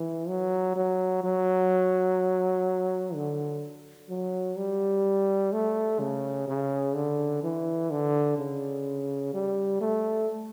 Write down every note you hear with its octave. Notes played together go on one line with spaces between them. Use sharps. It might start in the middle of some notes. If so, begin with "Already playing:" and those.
Already playing: E3
F#3
F#3
F#3
D3
F#3
G3
A3
C#3
C#3
D3
E3
D3
C#3
G3
A3